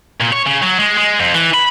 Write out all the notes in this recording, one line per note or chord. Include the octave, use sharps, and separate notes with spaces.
A#2
C#5
C#3
F#3
G#3
G#3
F2
E3
B5